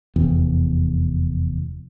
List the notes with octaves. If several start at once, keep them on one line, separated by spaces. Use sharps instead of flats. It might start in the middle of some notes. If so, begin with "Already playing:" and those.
F1 E2